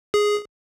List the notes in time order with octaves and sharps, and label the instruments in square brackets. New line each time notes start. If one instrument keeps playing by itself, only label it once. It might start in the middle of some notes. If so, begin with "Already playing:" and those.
[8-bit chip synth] G#4